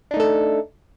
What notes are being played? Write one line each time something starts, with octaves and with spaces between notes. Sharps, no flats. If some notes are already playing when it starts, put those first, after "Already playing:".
A3 D4 D#4 A4